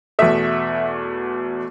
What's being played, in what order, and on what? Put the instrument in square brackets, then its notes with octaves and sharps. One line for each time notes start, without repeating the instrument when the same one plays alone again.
[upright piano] E2 B2 A3 E5